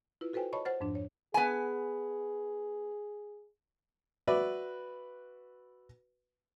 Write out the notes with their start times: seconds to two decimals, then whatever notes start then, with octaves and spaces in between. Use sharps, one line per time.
0.21 E4 F4 B4
0.33 F#4 A4 B4 C5 G5 G#5
0.53 C#5 D#5 A5 B5 C#6
0.65 C5 F#5 F6 A6
0.81 F2 G#2 F3 D4
0.95 C#5
1.34 B3 G#4 G#5
4.27 F#4 B4 D5 E5